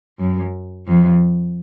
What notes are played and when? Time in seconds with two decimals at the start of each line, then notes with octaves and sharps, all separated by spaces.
0.19 F#2
0.88 F2